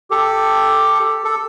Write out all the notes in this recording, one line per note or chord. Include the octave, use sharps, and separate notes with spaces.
G4 A4
A4